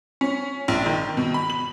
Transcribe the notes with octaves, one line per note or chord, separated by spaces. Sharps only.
C#4
A#1
D#3
B2
B5
F#7